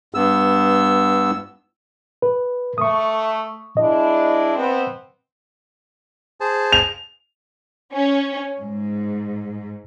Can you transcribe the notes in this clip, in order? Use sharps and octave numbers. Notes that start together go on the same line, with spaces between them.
G2 B3 E6
B4
A3 C#6 D#6
G#3 D4 E4 D#5
B3 C4
G#4 C5 A5
F7
C#4
G#2